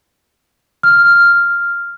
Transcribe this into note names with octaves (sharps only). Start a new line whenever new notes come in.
F6